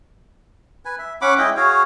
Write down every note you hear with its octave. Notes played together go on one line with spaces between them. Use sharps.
B4 G#5
E5
C#4 F#5 B5 D6
G#3 E4 D#5 G5
F#4 G#4 C#5 F5